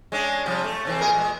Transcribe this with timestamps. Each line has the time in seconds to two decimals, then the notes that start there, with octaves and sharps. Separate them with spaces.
0.12 G#3 C#4 D4
0.46 C3 F3 G3
0.64 A3
0.85 C3 E3 C4
1.01 A#2 G#4 A#4
1.14 A#2 G#3